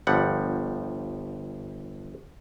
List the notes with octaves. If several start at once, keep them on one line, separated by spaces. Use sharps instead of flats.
G1 F3 G3 F#5